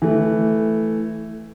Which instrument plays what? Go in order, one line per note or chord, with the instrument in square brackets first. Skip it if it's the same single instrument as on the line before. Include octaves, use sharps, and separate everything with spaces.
[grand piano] E3 A3